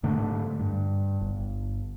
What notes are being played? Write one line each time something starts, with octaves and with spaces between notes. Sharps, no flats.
G#2 D3 A3
G2
G1